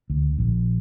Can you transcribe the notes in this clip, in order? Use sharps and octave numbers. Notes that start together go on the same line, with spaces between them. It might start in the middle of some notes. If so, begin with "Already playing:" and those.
D2
A#1